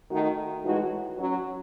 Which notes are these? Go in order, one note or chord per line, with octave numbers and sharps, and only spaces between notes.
D#3 A3 D#4 F#4
A2 E3 G#3 D#4 F#4
F#3 C#4 F#4